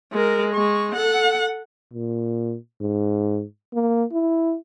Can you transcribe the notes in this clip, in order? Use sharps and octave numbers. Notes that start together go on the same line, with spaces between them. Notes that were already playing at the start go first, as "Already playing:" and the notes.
G#3 A#4
G#3 C#6
A4 F#5
A#2
G#2
A#3
E4